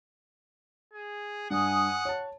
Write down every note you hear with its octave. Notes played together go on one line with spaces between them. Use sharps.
G#4
G2 F#5 G#5 D#6
C#5 A5